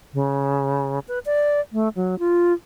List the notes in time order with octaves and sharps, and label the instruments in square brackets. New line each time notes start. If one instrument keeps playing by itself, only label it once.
[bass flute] C#3
B4
D5
A3
F#3
F4